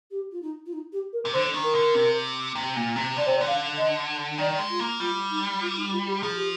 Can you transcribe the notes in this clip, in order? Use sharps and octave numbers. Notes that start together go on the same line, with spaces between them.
G4
F4
D#4
F4
D#4
G4
A#4
C3
D3 C5
D#3
A#4
D3
C3
C3
A#2
C3
D3 D5
C3 C5
D5
D3
F5
D#5
D#3 D5
G#3
F4
A#3
G3 F4
D#4
F4
D#4
F4
G4
F3 G#4
G4